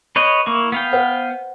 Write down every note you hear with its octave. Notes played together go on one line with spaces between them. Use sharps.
B4 C#5 D#5 G6
A#3 E4 C#6
B3 F5 G5
B4 C5 F#5